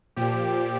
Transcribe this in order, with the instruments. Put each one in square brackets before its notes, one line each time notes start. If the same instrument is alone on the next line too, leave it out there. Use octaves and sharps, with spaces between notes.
[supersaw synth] A#2 F3 G4